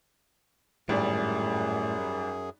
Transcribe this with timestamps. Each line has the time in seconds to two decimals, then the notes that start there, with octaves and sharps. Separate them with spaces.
0.89 G#1 F#2 A2 G3 G#4